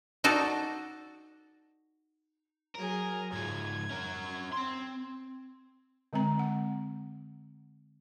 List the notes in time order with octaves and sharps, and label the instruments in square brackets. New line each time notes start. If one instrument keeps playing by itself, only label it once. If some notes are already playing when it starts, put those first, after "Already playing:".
[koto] D#4 F#4 A4 D5
[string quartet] F#3 G#4 [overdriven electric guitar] A#4
[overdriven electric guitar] G#2 F4 [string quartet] G#6
[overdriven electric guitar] C#4 A#4
C4 C6
[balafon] D3 G#3 C4 A#5
F#5